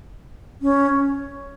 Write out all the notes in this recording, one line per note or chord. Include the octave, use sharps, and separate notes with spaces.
C#4